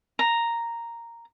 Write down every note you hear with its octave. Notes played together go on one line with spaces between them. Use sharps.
A#5